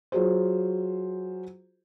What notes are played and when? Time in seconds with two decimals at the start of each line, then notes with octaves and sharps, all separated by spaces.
0.12 F#3 F4 F#4 G#4 C5